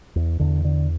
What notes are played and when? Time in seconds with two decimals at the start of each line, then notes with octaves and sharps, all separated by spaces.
0.16 E2
0.39 E2 D3
0.64 D3